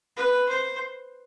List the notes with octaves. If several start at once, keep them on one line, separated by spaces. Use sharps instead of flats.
B4
C5